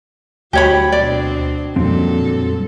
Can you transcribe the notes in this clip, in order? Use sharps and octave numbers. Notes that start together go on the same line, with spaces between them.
D2 F#3 F#4 G4 C#5 B5
B2 C4 D4 D5
F2 A#2 D3 F#3 G3 C4 A4